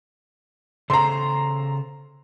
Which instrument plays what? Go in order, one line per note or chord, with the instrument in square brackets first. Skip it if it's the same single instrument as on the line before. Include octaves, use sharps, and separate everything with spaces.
[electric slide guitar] C#3 A4 C5 [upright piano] A#5 C6